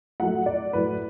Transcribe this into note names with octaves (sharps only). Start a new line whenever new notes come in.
A2 F#3 A3 F#5
D5
A2 F#3 A3 B4